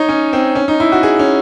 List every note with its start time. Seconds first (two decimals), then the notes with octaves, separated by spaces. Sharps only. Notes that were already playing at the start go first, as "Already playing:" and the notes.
Already playing: D#4 C#5 D#5
0.09 C#4
0.33 C4
0.55 C#4
0.68 D#4
0.80 E4
0.92 F#4
1.03 G#4
1.19 C#4